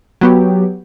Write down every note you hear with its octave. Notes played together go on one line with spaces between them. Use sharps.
F#3 B3 G4